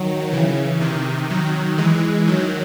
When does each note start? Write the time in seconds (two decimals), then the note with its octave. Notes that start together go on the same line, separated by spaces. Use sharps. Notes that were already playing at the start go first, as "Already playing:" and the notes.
Already playing: D#3 F#3
0.32 C#3 E3
0.81 C3 D#3
1.30 D#3 F#3
1.78 E3 G#3
2.27 D#3 F#3